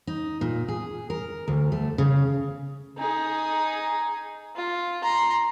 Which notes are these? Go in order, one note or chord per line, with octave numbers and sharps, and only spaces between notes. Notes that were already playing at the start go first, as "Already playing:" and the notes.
D#4
A#2
G#4
A#4
D2
A3
C#3
D#4 G#4
F4
A#5 C6